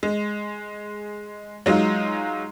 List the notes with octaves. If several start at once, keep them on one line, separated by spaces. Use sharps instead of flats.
G#3
F#3 G#3 D#4 F4